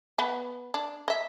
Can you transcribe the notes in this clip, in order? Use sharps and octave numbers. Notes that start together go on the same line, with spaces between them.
B3 B4
D4
D#5 E5